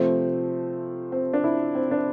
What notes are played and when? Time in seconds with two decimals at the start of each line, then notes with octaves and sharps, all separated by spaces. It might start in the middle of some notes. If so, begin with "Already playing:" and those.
Already playing: C3 F3 A3 C4
1.12 C4
1.33 D4
1.44 E4
1.75 C4
1.91 D4